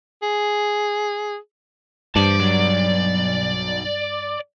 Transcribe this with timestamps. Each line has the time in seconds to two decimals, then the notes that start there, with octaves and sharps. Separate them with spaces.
0.22 G#4
2.16 G2 C5 D5 A5
2.39 B1 F#3